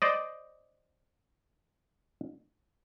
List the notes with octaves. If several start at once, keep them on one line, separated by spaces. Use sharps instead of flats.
C5 D5 D#5